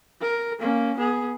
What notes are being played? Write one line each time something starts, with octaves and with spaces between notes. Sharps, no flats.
A#4
A#3 C#4
B3 G#4